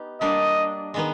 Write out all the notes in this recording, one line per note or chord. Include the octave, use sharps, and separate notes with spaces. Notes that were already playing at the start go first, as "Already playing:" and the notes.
Already playing: B3 D#4 G4
G3 A#3 D4 D#5
D#3 G#3 B3 D#4